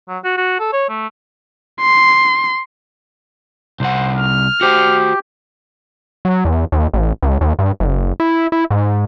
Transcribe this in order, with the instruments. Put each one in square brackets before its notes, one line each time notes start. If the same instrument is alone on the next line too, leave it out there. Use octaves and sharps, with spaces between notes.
[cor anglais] F#3
F#4
F#4
A4
C#5
A3
[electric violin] C6
[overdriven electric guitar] C2 F#5 [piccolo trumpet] C5
[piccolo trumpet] F6
[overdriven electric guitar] F#4 C5 [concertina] G4
[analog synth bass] F#3
E2
D#2
A1
C#2
D#2
G2
F#1
E4
E4
G#2